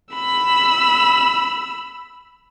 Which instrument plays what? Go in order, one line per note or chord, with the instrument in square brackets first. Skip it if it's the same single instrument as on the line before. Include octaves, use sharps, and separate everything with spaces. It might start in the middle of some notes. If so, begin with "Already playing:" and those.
[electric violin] B5 E6